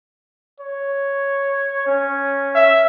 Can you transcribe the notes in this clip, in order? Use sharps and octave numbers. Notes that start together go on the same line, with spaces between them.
C#5
C#4
E5